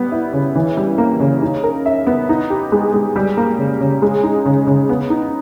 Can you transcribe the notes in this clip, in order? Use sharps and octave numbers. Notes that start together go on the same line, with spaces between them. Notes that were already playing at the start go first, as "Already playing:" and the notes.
Already playing: G3 B3
E4
C#3
E3
G3
A#3
C#3
D#4
A#4
E5
B3
D#4
G4
G#3
G#3
G3
A#3
C#3
C#3
G#3
D#4
C#3
C#3
B3
D#4